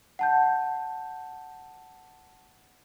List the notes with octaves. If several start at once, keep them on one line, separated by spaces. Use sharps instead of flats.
F#5 A5 G6